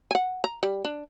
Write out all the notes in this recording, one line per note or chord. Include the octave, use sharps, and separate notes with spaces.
F#5 G#5
A#5
G3
D4